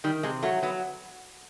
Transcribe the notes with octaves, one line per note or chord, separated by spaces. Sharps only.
D#3 G3
C3 G#3
F#3 A3
F#3 B3